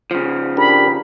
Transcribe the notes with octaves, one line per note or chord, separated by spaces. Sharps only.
C#3 F3
D4 G4 A#4 B5